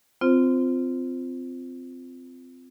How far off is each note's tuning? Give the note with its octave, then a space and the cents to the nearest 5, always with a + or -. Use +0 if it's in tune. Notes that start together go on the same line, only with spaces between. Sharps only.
C4 -20 F4 +0 C5 +0